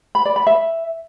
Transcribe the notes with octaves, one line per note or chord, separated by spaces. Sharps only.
B5
D5
B5
E5